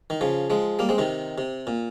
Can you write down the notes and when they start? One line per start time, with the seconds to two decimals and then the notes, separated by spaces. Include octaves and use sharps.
0.10 D#3
0.21 C#3 F3
0.50 F3 G#3
0.79 G3 A#3
0.89 G#3 C4
0.98 C3 D#3
1.38 C3
1.67 A#2